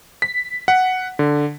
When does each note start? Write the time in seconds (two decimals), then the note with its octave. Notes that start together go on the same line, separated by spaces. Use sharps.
0.22 B6
0.68 F#5
1.19 D3